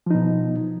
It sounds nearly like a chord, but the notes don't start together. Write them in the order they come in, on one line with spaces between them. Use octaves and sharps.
F3 D#4 B2